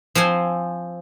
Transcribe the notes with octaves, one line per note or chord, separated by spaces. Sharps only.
F3 C4 C5 G#5